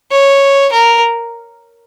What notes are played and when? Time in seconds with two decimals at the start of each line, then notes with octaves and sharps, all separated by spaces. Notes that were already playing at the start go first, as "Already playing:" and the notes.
0.12 C#5
0.73 A#4